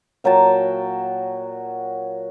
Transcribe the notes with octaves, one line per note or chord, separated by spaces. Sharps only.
A#2 F#3 G5 A5